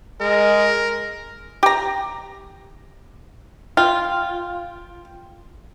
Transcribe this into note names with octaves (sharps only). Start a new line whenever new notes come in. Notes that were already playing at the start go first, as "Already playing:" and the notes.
G#3 A#4
G4 A#5
F4 G5